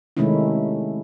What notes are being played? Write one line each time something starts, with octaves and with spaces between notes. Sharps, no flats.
C3 D#3 G#3 A3 C#4 E4